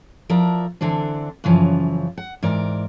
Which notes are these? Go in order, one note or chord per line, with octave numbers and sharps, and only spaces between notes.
F3 E4 A#4 D5
D3 E3 C4 D4
F#2 C#3 E3 F3
F#5
G#2 E3 A#4 D5